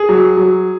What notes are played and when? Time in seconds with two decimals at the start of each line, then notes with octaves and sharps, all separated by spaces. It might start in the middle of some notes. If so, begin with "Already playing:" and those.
Already playing: G#4
0.09 F#3
0.37 F#3